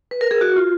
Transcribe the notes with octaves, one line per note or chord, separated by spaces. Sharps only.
B4
A#4
G#4
F#4
F4